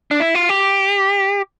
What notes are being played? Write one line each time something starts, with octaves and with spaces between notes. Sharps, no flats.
D4
E4
F4
G4